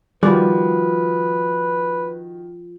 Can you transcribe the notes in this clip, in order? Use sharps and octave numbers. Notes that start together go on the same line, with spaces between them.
D#3 F3 G3 F#4 B4 D5